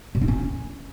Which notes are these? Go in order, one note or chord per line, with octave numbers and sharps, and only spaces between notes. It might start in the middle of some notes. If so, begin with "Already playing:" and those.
B2
D#4
C#4